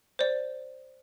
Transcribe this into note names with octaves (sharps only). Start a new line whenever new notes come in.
C5 D5